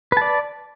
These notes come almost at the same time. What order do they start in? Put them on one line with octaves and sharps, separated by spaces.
B4 A5 D5